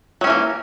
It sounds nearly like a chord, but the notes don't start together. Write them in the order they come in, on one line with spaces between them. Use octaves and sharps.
F#3 C#4 E3 A#3